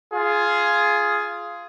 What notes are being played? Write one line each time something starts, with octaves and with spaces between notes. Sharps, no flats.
F4 G#4